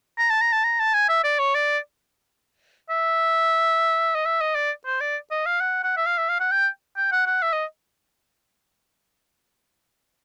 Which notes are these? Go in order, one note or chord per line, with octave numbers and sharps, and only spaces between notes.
A#5
A5
A#5
A5
A#5
A5
G#5
E5
D5
C#5
D5
E5
D#5
E5
D#5
D5
C5
D5
D#5
F5
F#5
F#5
E5
F5
E5
F5
F#5
G5
G5
F#5
F#5
E5
D#5